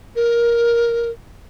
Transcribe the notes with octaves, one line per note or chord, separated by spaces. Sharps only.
A#4